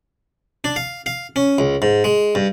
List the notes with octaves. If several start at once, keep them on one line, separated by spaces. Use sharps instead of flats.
D4
F5
F5
C#4
C#2
G#2
G#3
G2